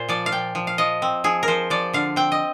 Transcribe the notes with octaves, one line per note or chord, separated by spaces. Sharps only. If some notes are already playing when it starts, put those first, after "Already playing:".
Already playing: A#2 C5
F3 D5
F5
A#2 G5
F3
F5
F3 D#5
C4
F3 G#4
A#4
F3 C5
F3 D5
D3 F5
C4 G5
D#5